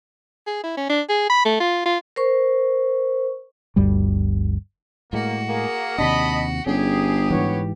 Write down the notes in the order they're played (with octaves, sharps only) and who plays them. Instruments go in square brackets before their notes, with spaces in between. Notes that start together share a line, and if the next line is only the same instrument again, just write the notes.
[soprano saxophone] G#4
E4
C#4
D4
G#4
B5
A3
F4
F4
[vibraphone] A#4 C5 C#6
[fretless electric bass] G1 D2 G2 G3
[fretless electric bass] A2 G#3 [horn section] A#3 [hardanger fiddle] F#4
[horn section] A#3 G#4 A#4
[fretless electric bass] D#2 C3 D4 [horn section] D#5 A5 B5
[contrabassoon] G1 [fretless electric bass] C#4 [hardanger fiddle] G4 [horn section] G#4
[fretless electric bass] G#2 E3 [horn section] B3 C#5